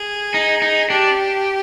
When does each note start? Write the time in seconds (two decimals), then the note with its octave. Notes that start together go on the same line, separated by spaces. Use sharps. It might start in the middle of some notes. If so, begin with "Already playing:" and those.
Already playing: G#4
0.34 D#4
0.62 D#4
0.90 D4 G4